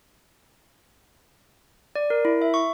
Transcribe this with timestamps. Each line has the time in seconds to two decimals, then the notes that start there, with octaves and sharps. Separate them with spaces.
1.95 D5
2.10 A#4
2.25 E4
2.42 E5
2.54 C#6